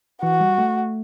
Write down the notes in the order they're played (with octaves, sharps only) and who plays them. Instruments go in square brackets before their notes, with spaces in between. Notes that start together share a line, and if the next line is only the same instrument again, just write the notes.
[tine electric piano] E3 [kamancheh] F#4
[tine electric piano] G3
A3